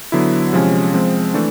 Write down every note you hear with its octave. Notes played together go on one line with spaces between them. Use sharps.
D3 F#3 B3 E4
C3 F3 G#3 C#4
F3 G#3 C4
E3 A3 D4